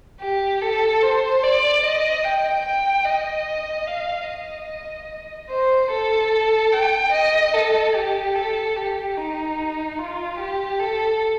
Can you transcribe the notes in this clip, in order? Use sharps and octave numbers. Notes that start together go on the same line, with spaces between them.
G4
A4
C5
D5
D#5
G5
G5
D#5
F5
D#5
C5
A4
G5
D#5
A4
G4
A4
G4
D#4
F4
G4
A4